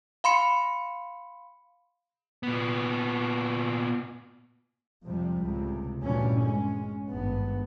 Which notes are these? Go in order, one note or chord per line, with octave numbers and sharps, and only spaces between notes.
F5 B5 C6 C#7
A#2 B3
F2 C3 F3 G3
C#2 A2 C3
D2 G2 A#2 E3 G3 C#4
G#3 C#4
G#1 G2 B3